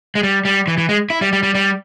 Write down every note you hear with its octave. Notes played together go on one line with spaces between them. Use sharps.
G#3
G3
G3
E3
E3
G#3
E4
G3
G3
G3
G3